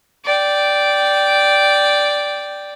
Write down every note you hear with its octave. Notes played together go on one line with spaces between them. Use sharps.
D5 G5